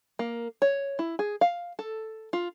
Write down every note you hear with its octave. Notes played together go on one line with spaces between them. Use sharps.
A#3
C#5
E4
G#4
F5
A4
F4